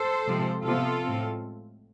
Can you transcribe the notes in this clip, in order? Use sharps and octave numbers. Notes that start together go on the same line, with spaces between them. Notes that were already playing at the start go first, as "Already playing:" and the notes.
Already playing: A4 C5
C3 F3 G#3 C4
C3 F3 B3 F4 A4
A2 G#3 C4